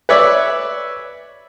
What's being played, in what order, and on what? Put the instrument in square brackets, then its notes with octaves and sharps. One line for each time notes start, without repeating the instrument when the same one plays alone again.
[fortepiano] B4 C#5 D5 E5